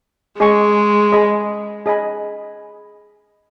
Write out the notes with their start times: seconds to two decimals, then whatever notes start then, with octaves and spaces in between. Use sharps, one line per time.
0.39 G#3 G#4 D#5 G#5 C#6
1.12 G#4 D#5 G#5 B5
1.86 G#4 D#5 G#5 B5